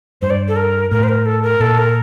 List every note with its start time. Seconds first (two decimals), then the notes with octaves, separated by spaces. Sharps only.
0.22 G2 C5
0.30 D5
0.48 A4
0.56 A#4
0.91 A2 A#4
1.03 C5
1.09 A#4
1.26 A4
1.43 A#4
1.60 A#2 A4
1.78 A#4